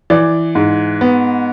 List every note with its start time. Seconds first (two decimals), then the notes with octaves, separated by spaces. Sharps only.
0.10 E3 D5
0.55 G#2
1.01 B3